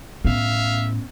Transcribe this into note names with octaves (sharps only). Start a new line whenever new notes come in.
A2 B3 C#4 E5 F5